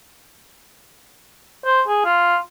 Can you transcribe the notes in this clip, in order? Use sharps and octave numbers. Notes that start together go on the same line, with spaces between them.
C5
G#4
F4